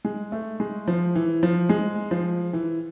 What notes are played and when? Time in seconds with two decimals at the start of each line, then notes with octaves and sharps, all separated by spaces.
0.05 G#3
0.32 A3
0.60 G#3
0.88 F3
1.15 E3
1.43 F3
1.69 G#3
2.11 F3
2.53 E3